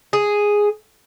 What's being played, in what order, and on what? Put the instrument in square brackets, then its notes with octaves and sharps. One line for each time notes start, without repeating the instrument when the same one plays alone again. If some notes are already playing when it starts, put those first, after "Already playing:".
[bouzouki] G#4